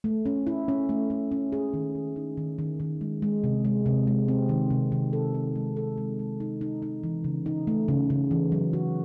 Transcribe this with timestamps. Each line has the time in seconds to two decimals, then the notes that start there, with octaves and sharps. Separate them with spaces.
0.04 A3
0.26 C#4
0.47 E4
0.68 C#4
0.89 A3
1.10 A3
1.31 C#4
1.52 G#4
1.74 D#3
1.95 D#3
2.16 D#4
2.37 D#3
2.59 D#3
2.80 D#3
3.01 G#3
3.22 G#3
3.44 C3
3.65 G#3
3.86 C3
4.07 G#3
4.28 C4
4.49 D#3
4.71 C3
4.92 D#3
5.13 A4
5.34 D#4
5.55 G#3
5.77 A4
5.98 G#3
6.19 G#3
6.40 D#4
6.61 D#4
6.82 D#4
7.03 E3
7.24 C#3
7.46 D#4
7.67 A3
7.88 C#3
8.10 C#3
8.31 E3
8.52 F#3
8.73 F#4